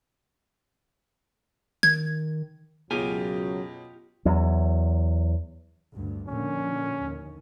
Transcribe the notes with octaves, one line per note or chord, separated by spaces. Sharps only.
D#3 G#6
C#2 F#2 B2 F#3 F4 G4 G#4 G#5
E2 F#3
D2 G2
A#2 D3 F3 C#4
D#2